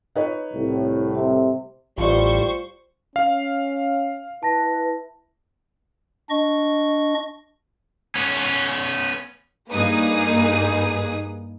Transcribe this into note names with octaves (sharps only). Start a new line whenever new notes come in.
D#4 B4 C#5
C2 A2
C3
A1 G3 F4 C5 D5 C#6
C#4 F5
E4 B4 A5 A#6
D4 D#5 C#6
B3 C#4
G2 A#3 D#4 G#4 B4 D#6